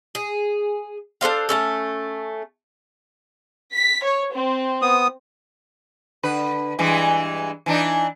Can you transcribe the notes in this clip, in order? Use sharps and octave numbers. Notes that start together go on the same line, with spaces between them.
G#4
D4 A4 C5 F5
A3 C#4 A4
B6
C#5
C4
B3 D#6
D3 B4
G2 E3 G#3
E3 D4 D#4